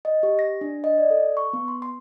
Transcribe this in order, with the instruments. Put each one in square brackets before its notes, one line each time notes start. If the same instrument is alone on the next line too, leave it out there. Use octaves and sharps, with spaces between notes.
[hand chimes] D#5
G4
A#6
D4
D#5
D5
A4
C#6
B3
C6
C6